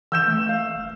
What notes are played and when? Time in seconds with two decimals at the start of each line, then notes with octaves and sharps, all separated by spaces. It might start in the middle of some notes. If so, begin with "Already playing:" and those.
0.12 E3 E6 G6 E7
0.27 A3
0.49 F5
0.75 E1